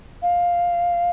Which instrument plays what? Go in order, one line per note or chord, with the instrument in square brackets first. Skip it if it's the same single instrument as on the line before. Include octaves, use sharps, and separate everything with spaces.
[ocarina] F5